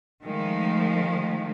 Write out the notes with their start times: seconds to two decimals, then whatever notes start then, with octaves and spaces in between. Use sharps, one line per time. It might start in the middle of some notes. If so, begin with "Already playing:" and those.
0.23 D#3 F3 G#3 A3